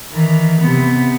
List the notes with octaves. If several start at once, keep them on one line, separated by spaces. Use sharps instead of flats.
D#3 E3
C3 B3